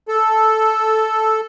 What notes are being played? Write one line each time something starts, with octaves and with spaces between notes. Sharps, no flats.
A4